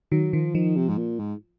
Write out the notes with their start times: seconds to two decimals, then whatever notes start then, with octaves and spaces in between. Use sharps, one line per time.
0.12 D#3 F#3
0.33 D#3 F3
0.55 D#3 F3
0.76 C3
0.89 G#2
0.98 A#2
1.19 G#2